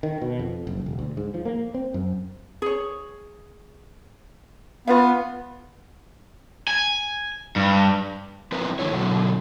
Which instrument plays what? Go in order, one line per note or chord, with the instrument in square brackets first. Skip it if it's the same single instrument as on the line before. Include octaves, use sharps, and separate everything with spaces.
[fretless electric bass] D#3
B2
F2
F#1
E1
D2
G#2
F3
A#3
C4
F#2
[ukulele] G#4 C#5
[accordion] B3 [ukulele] F4 B4 F5
[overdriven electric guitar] G#5
G2
[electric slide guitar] F3 C4 E4 A#4 B4
D#3 A3 D4 E4 C#5
B2 D3 F#3